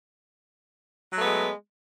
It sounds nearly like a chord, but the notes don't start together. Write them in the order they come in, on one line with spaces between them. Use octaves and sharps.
F#3 A3 B3 G#3